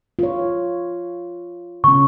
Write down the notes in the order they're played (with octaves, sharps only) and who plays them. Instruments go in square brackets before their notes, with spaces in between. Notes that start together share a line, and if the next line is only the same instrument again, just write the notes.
[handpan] F4 C#5
[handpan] C#3 C#4 [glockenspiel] C#6